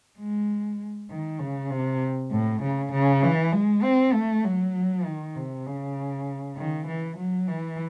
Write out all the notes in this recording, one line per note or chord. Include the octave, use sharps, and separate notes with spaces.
G#3
D#3
C#3
C3
A2
C#3
C#3
E3
G#3
C4
A3
F#3
D#3
C3
C#3
D#3
E3
F#3
E3